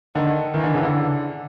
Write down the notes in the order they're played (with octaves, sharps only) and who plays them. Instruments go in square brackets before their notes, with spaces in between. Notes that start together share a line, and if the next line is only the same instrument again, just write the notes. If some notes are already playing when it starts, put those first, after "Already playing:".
[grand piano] D3 [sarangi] D#3
[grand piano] D#3 [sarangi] E3
[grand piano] D3
C#3
D3